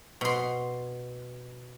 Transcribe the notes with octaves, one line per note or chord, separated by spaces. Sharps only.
B2 C6